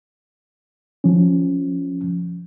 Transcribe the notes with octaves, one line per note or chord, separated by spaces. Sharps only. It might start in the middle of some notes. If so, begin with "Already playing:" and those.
F3 C#4